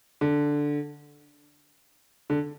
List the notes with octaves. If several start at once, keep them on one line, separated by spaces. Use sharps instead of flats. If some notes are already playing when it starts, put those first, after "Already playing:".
D3
D3